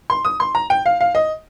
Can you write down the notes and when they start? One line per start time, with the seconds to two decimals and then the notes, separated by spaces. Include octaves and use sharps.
0.10 C6
0.25 D#6
0.40 C6
0.55 A#5
0.70 G5
0.86 F5
1.01 F5
1.15 D#5